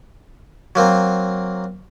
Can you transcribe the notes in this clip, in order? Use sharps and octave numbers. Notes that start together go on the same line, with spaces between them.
F#3 A#3 C4